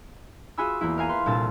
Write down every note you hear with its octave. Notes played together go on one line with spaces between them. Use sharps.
F4 F#4 G#4 G#5 B5 E6
E2 A#3 E4
A#4 F5 G#5 A#5
B4 C6
C2 A#2 D4 A4 A6